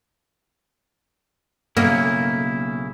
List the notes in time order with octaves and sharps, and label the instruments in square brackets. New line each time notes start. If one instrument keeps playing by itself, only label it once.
[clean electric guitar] B1 C#3 E4 [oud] A#3